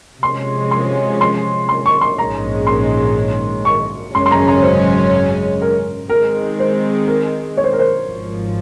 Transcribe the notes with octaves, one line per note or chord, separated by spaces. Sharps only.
C3 F3 G#3 C#4 C6
C6
C6
C6
C#6
C6
A#1 G#2 D#3 G#3 C#4 A#5
C6
C#6
G#1 F#2 C#3 G#3 C#4 C6
C6
A#5
A#5
C5
A#4
D#3 G#3 C4 A#4
C5
A#4
C#5
C5
A#4
C5
G#1 G#2 F3